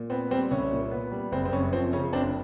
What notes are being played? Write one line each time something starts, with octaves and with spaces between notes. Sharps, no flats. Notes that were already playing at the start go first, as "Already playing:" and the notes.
Already playing: A#2
B3 C4
G3 C4
C2 C#4
A#2
B3
G3
F#1 C4
C4
F#2 C#4
F3 C4
C#3 C#4
F#1 C4 D4